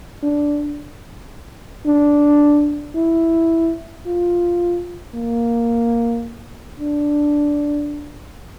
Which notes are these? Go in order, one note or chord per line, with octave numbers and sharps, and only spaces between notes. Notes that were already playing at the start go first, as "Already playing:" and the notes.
D4
D4
E4
F4
A#3
D4